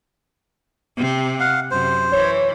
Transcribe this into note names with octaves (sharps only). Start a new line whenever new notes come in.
C3 C4
F5 F#5
F#2 C3 C5
E3 C#5